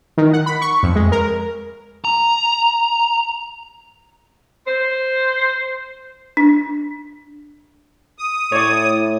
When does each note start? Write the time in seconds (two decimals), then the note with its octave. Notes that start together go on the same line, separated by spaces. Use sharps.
0.18 D#3
0.33 F#5
0.46 B5
0.61 C#6
0.83 F2
0.96 G#3
1.12 A#4
2.05 A#5
4.66 C5
6.37 D4
8.19 D#6
8.52 A2 C#5 D5